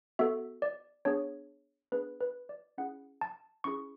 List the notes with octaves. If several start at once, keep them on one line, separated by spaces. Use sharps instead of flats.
B3 F#4 A4 E5
D5
B3 D4 G#4 C#5
B3 D4 G#4 B4
B4
D5
C#4 E4 G#4 F#5
A5
C#4 E4 G#4 C#6